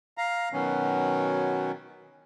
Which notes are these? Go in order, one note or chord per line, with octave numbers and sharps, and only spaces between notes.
F5 A#5
B2 D#3 F#3 B3 C#4